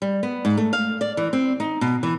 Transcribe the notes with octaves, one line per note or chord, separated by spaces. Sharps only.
G3
B3
G#2
A3
F5
D5
E3
C4
D#4
B2
E3